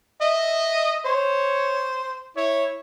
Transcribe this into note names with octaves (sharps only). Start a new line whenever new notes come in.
D#5 E5
C5 C#5
E4 C#5